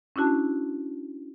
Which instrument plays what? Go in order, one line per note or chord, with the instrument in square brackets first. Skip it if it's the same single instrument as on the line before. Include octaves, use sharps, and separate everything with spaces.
[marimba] C#4 D4 E4 F#4 A5